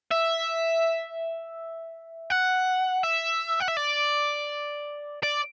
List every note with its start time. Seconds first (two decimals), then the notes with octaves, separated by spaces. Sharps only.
0.12 E5
2.30 F#5
3.04 E5
3.60 F#5
3.68 E5
3.77 D5
5.23 D5